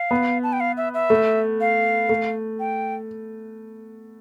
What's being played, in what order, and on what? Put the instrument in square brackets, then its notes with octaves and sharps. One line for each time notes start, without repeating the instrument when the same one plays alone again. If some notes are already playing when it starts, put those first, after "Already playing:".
Already playing: [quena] F5
[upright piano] B3
[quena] A5
G5
F5
E5
E5
[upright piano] A3
[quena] F5
[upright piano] A3
[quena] G5